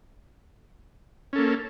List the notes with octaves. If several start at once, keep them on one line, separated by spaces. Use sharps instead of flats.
A#3 C#4 A4